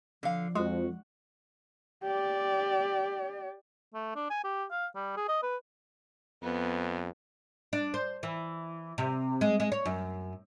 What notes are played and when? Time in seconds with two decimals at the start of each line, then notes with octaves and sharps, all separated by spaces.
0.23 D3 F3 F5
0.55 F2 G#3 F#4
2.03 G4 D5
3.95 A3
4.16 D4
4.30 G#5
4.44 G4
4.71 F5
4.95 G3
5.17 G#4
5.29 D#5
5.43 B4
6.42 F2 B3
7.73 D4
7.94 C5
8.23 E3
8.98 C3
9.41 G#3
9.60 G#3
9.72 C#5
9.86 F#2